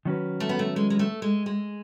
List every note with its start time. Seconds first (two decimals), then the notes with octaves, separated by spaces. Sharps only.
0.05 D#3 F#3 C#4 F#4 B4
0.40 A3
0.49 B3
0.59 A3
0.76 G#3
0.90 G#3
0.99 A3
1.22 G#3
1.46 G#3